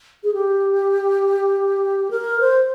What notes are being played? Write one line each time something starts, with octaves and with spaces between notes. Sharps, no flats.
G#4
G4
A#4
C5